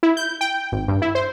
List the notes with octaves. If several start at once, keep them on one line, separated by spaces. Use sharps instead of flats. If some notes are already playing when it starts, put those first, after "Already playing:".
E4
G6
G5
G#1
G2
E4
C5